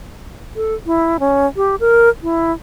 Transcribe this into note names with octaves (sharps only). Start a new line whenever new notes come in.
A4
E4
C#4
G4
A#4
E4